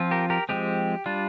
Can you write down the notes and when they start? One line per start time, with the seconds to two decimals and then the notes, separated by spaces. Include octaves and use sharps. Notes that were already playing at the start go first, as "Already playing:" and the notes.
Already playing: F3 C4 F4
0.11 G4 A#4
0.30 G4 A#4
0.49 F3 G#3 C4 G4
1.06 G3 D4 F4